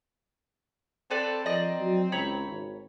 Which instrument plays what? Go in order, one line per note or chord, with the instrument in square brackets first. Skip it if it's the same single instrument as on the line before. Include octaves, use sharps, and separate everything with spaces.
[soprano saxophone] C4 [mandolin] A4 B4 D5
[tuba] F3 [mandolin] D5 D#5 A#5
[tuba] F#3
[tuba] C#2 [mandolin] C#5 A#5 B5
[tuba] G#1